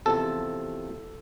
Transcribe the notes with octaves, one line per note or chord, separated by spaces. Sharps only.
E2 C3 F3 A4